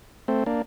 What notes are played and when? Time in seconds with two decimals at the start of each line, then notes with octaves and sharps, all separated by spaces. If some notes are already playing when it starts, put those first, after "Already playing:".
0.28 A3 C4
0.46 A#3 D4